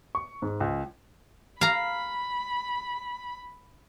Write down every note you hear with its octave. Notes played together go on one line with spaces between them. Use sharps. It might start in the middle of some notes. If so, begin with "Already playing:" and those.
C#6
G#2
C#2
F5 A#5 B5